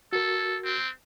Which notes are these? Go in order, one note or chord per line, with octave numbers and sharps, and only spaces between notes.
F#4 A4 A#4
C4